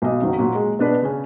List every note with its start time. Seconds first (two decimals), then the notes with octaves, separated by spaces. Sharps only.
0.02 B1 D#5
0.22 F#1 D#3 F#3
0.38 A#2 F#3
0.55 G#3
0.79 B2 D4 B4
1.02 C#3 C#4